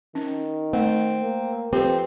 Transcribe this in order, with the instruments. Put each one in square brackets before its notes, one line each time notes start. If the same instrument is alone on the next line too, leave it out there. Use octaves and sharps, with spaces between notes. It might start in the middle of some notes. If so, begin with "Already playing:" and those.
[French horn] D#3 [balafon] C#4
[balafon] A3 [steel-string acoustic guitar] C4
[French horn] A#3
[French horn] F2 [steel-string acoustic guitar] C4 [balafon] G4 B4